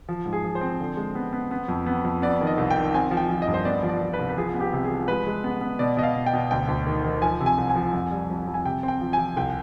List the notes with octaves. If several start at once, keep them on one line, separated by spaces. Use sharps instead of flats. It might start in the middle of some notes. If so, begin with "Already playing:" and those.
F3
G#2
G#4
F3
C5
C4
D3
G#3
B3
B3
B3
F2
B3
F2
B3 D5
D#3
D#5
C2
G5
D#3
C4 G#5
F3
G5
F3
D#5
G2
C5
B3 D5
F3
D5
F3
B4
C2
B4
F3 G#4
B3
G4
C3
G#4
F3
G#3 B4
G#3
B3
B3
B2 D5
B2 D#5
F5
B2
G5
B2
D2 G5
D2
D#3
D#3
F3 G#5
C3
G#5
C2
G#5
F3
F2
G3
F2
F2
G#5
C3 G5
C4
G5
F3
F3 G#5
C2 G5